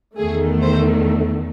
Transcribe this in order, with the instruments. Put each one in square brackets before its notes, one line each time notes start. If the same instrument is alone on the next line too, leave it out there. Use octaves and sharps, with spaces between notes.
[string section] E2 D#3 A3 G#4
C5